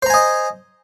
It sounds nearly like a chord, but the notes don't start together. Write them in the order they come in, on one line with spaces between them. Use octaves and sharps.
C5 A#5 G#5 D#5